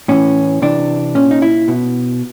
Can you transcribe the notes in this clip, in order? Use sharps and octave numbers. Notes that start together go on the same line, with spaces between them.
A2 E3 C#4
C3 E3 D4
A#2 C#4
D#4
E4
B2